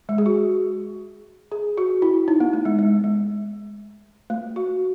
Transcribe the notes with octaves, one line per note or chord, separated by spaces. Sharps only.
G#3
G#4
F#4
G#4
F#4
E4
D#4
B3
A3
G#3
G#3
G#3
A3
F#4